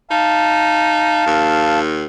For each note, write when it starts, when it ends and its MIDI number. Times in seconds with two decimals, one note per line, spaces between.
0.11 1.24 63
0.11 1.79 77
0.11 1.79 81
1.26 2.06 39